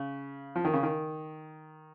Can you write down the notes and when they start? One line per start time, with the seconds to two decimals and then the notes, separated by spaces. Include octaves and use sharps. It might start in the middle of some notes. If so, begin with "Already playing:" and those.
Already playing: C#3
0.56 F3
0.65 D#3
0.73 C#3
0.83 D#3